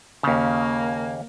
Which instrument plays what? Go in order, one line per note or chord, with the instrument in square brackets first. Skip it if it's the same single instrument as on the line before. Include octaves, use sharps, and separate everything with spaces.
[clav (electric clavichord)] D#2 C#3 [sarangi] A#3